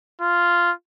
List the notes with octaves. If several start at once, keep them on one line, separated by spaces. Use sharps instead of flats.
F4